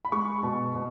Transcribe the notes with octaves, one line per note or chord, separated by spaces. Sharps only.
B5
G#3 C#6
B2
B2